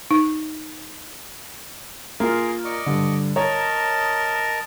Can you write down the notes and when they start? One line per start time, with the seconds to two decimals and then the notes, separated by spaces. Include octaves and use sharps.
0.11 D#4
2.20 A#3 F4 G#4 A#4 C6
2.65 D5 D#5 C#6
2.86 G2 D3
3.36 A#4 C#5 D#5 A5 A#5